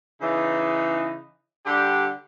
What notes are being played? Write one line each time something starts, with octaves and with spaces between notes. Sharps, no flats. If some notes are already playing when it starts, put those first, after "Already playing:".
C#3 E3 D#4
D3 G3 D4 G4